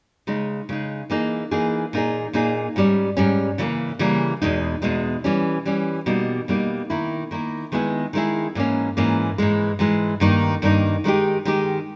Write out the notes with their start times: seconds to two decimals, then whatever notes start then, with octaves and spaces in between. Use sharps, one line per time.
0.27 C#3 G#3 D#4
0.69 C#3 G#3 D#4
1.10 E3 A#3 D#4 G#4
1.51 E3 A#3 D#4 G#4
1.93 A#2 A#3 D#4 G#4
2.33 A#2 A#3 D#4 G#4
2.76 G#2 G3 C#4
3.17 G#2 G3 C#4
3.58 C#3 E3 G3 A#3
3.99 C#3 E3 G3 A#3
4.42 E2 B2 G#3 D#4
4.82 E2 B2 G#3 D#4
5.24 E3 G3 C#4
5.65 E3 G3 C#4
6.06 B2 G3 A#3 D#4
6.48 B2 G3 A#3 D#4
6.89 D#3 A#3 E4
7.31 D#3 A#3 E4
7.72 D#3 G#3 B3 E4 G#4
8.13 D#3 G#3 B3 E4 G#4
8.55 G#2 E3 A#3 C#4
8.97 G#2 E3 A#3 C#4
9.38 G#2 E3 G#3
9.79 G#2 E3 G#3
10.20 G2 D#3 A#3 D#4
10.62 G2 D#3 A#3 D#4
11.04 D#3 G#3 D#4 G4
11.45 D#3 G#3 D#4 G4